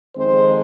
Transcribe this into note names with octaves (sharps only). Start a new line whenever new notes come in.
F2 D#3 G#3 C4 C5